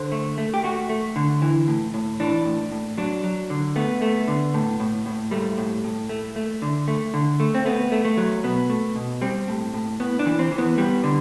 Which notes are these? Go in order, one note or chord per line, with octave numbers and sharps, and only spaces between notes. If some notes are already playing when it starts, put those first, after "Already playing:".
Already playing: D3 C5
A3
A3
G4
A3 F#4
A3
D3
E3
A2
A2
E3 D4
A2
A2
F#3 D4
F#3
D3
A3 B3
A3
D3
A2
A2
A2
G3 A3
A2
A2
A3
A3
D3
A3
D3
A3
C4
A3 B3
A3
A3
F#3
B2 B3
A3
B2
G3 C4
A2
A2
A2 B3
D4
E3
C4
E3
B3
G3 B3
D3